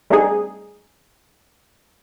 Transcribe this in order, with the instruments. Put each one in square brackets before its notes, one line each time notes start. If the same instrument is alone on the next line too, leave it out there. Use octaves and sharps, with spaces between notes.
[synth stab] G3 A3 C4 D4 D#4 G#4